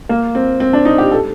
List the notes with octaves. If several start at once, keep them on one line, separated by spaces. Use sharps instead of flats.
A#3
C4
C4
D4
D#4
G4
A4